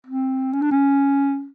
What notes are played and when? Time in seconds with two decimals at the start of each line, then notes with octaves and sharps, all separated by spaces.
0.07 C4
0.53 C#4
0.62 D4
0.71 C#4